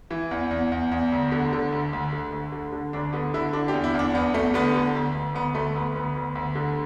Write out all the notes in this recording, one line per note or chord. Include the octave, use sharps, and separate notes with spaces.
E3
E2
E2
E2
E2
D2
D3
D3
D2
D2
D3
D2
D3
D3
D2 D4
D3 B3
D3 E4
D3 D4
G4
E2
E4
E2
D4
E2 B3
E2 A3
D3 B3
D3
D2
D2
D2 B3
D2 A3
D2 B3
D2 B3
D2
D2
D3